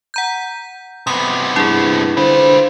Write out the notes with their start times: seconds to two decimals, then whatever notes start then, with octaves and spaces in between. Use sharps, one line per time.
0.14 F#5 A#5 G6
1.07 C3 B3 D#6
1.56 G2 E4 G#4
2.17 D3 F4 B4 C5